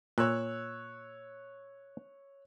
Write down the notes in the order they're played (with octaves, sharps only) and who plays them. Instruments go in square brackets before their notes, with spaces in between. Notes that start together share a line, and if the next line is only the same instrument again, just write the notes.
[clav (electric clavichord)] A#2 [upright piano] C#5 E6 F#6